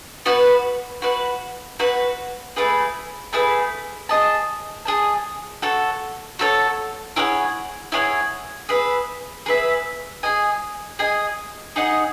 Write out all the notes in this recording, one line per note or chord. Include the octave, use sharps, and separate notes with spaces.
B3 F#4 B4 F#5
F#4 B4 F#5
F#4 B4 F#5
A3 E4 G#4 B4
A3 E4 G#4 B4
G#4 D#5 A5
G#4 D#5 A5
F#4 A4 C#5
F#4 A4 C#5
E4 G#4 C#5 F#5
E4 G#4 C#5 F#5
G#4 B4 E5
G#4 B4 E5
G#4 D#5 G#5
G#4 D#5 G#5
D#4 G#4 D#5 F#5